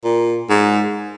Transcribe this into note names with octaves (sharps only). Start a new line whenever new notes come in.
A#2
G#2